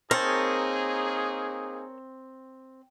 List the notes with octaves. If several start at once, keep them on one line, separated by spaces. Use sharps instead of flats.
A#3 C4 D#4 G#4 A#4 C#5 A5